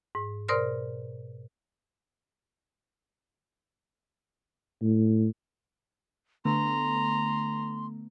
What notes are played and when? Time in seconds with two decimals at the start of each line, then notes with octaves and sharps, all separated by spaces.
0.15 G#2
0.48 B2 A#4 C5 D5 C6 F6
4.82 A2
6.45 D3 A3 B3 A#5 C6